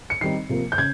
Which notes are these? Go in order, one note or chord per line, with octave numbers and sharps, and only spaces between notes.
C#7
D#3 G3 C4 D#4 C7
C3 F3 A#3
G6
C#3 G#6